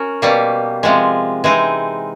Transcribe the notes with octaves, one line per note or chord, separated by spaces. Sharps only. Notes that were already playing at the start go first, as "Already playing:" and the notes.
Already playing: C#4 F#4 A#4
B2 G3 A#3
C3 F3 G#3
E3 G#3 C4 D#4